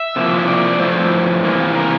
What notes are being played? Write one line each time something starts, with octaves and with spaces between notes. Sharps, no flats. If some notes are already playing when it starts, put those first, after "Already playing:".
Already playing: E5
C3 F3 A#3 E4
E5
D5
G2 F3 A3 E4 C5
C3 E3 A#3
A#4